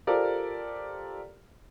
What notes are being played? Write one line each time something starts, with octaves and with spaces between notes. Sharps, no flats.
F4 G4 A4 A#4 C5 D5